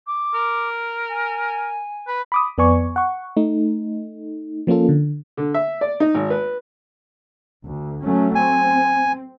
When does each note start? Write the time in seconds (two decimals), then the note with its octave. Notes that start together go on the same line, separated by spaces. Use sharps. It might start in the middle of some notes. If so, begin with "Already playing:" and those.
0.07 D6
0.34 A#4
1.09 G#5
2.07 B4
2.32 B5 D6 D#6
2.58 F2 B3 D5 G#5 C#6
2.96 F#5 C#6
3.37 A3 D#4
4.67 F3 A#3 C#4 F4 A4
4.89 D3
5.37 D3
5.54 E5
5.81 D5
6.00 D#4
6.14 G#1
6.30 B4
7.63 D2
8.04 F#3 A3 C#4
8.35 C4 G#5